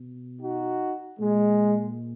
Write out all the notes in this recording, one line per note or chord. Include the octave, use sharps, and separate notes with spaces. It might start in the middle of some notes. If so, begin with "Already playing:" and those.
Already playing: B2
D#4 F#4
A#2 G#3